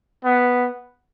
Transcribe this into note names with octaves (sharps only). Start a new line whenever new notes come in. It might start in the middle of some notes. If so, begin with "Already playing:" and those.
B3